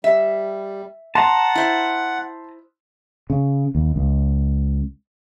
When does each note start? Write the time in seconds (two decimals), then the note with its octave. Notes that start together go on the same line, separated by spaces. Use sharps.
0.04 G3 E5
1.15 F#5 A5 A#5 C6
1.55 E4 C5
3.30 C#3
3.75 D#2
3.96 C#2